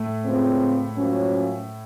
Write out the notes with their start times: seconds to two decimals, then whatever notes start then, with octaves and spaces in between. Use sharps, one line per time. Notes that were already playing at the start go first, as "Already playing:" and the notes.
Already playing: A2 A3
0.24 C#2 C#3 F3 C4
0.96 F#2 F3 A#3 C#4